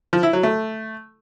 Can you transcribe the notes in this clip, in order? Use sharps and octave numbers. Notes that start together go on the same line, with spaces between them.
F3
E4
F#3
A3